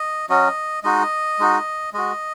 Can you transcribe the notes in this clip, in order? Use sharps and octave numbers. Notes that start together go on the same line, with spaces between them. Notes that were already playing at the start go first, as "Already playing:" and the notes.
Already playing: D#5
F#3 C#4 F#4 D#5
G#3 D#4 F#4 D#5
G#3 D#4 F#4
G#3 F#4 D#5